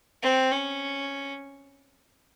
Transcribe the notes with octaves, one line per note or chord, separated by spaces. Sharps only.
C4
C#4